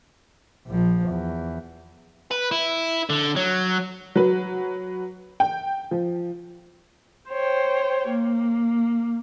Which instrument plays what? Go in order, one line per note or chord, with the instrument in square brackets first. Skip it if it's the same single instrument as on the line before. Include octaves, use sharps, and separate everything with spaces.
[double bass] A#1 F3
E2
[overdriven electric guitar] B4
E4
D3
F#3
[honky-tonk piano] F#3 B4
G5
F3
[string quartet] C5 C#5 G5
A#3